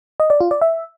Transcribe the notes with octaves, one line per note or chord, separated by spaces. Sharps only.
D#5
D5
F4
D5
E5